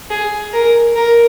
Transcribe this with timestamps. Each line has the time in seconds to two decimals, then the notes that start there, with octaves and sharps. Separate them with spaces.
0.10 G#4
0.53 A#4
0.96 A#4